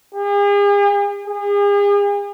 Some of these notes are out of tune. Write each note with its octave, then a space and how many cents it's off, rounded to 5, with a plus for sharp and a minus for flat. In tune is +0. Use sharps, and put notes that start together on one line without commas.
G#4 -45
G#4 -40